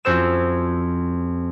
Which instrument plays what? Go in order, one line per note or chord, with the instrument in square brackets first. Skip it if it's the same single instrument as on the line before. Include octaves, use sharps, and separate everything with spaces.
[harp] F2 C#4 F#4 C5 E6 E7